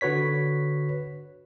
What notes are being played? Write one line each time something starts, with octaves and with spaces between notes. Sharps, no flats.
D3 F#4 B4 C#5 B6